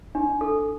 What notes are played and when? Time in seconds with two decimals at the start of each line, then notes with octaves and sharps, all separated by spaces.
0.15 D4
0.41 A4